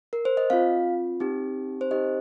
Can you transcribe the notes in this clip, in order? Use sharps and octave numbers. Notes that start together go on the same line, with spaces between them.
A#4
C5
D#5
C4 F4 F5
C4 D#4 G4
C5
C4 D#4 G4 D#5